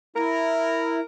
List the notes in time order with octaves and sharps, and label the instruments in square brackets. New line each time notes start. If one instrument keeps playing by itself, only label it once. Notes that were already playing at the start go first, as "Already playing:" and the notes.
[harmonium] E4 [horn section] A#4